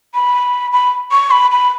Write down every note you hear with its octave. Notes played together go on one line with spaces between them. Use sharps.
B5
B5
C#6
B5
B5